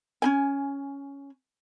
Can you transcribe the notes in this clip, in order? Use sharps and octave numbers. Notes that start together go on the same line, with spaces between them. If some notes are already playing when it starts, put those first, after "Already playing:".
C#4 D#4 G#5